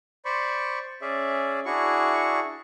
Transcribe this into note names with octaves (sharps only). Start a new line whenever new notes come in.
C5 D5 B5 C#6
C#4 G#4 D5 E5
D4 E4 F#4 G#4 C#6